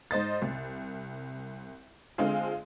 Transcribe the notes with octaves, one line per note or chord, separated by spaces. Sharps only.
G#2 C5 D#5 A6
C2
D3 G#3 C4 F4 G#4